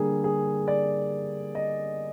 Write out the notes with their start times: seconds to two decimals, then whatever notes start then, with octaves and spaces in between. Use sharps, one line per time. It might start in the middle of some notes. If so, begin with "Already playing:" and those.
Already playing: D3 G3 A#3 G#4
0.24 G#4
0.68 D5
1.55 D#5